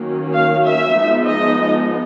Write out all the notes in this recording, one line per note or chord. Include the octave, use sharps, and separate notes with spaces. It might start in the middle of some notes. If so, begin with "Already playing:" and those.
Already playing: D#3 F#3 A#3 C#4
F5
E5
F3 G#3 B3 D#4
D#5